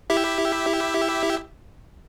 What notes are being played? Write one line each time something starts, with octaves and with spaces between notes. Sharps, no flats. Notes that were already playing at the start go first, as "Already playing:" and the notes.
E4 G4 E5